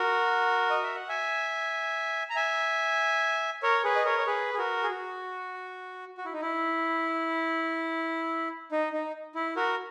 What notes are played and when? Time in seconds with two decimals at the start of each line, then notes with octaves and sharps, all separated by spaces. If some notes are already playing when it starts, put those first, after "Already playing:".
Already playing: F#4 A#4
0.70 D#5
0.83 E5
0.96 F#5
1.09 E5 G#5
2.30 A#5
2.36 E5 G#5
3.63 A#4 C#5
3.84 G#4 B4
3.96 D#5
4.05 A#4 C#5
4.19 C#5
4.27 G#4 B4
4.54 G#4
4.58 F#4 A#4
4.83 G#4
4.90 F#4
6.18 F#4
6.25 E4
6.33 D#4
6.41 E4
8.72 D#4
8.93 D#4
9.35 E4
9.56 F#4 A#4